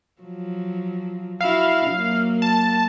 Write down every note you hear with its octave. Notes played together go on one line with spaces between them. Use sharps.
F3 F#3
E4 F#4 F5
F#3 A#3
A5